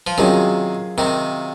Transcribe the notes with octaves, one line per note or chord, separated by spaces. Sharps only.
F3
C3 D#3 F#3 C#4 F4 G#4
C3 D#3